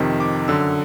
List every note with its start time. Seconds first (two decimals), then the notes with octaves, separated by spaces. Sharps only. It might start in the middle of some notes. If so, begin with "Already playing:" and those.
Already playing: F2 C3 D#3
0.20 D6
0.48 F#2 D3 E6